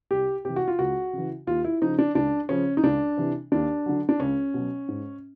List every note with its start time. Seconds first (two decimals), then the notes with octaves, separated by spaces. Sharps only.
0.11 C2 G4
0.45 C3 E3 G4
0.56 F#4
0.68 F4
0.79 C#2 F#4
1.13 C#3 E3
1.47 D#2 F4
1.64 E4
1.81 C#3 F3 D#4
1.99 D4
2.15 C#2 D4
2.49 C#3 F3 C#4
2.77 D#4
2.83 C#2 D4
3.17 C3 E3
3.52 D#2 D4
3.86 D3 F#3
4.09 D4
4.20 C#2 C#4
4.54 B2 F#3
4.88 G#2